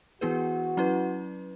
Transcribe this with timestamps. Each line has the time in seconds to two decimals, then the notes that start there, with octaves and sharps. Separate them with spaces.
0.21 E3 B3 E4 F#4 G#4 B4
0.77 F#3 C#4 E4 B4